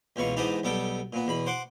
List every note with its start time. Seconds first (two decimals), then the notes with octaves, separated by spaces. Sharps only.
0.16 C#2 B2 E3 F4 C#6
0.37 G#2 E3 B3 D#4 G4 A5
0.63 B1 G3 B3 A4 G5
1.13 A#2 B3
1.27 E2 B2 B5
1.46 C5 F#5 D6